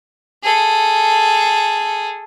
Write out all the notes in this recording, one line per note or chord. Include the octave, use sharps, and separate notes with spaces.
G#4 A4